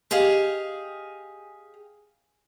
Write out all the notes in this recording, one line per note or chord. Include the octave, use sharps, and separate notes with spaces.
G4 G#4 D#5 F5